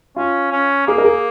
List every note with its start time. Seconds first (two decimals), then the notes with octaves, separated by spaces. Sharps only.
0.16 C#4 F4
0.52 C#4
0.87 A#3 G#4
0.98 A#4
1.05 G#4